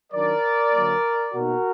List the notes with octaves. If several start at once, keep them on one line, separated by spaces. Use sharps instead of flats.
D#3 F#3 D4 A#4 D5
D3 F#3 A#3
B2 A#3 D#4 F#4 A#4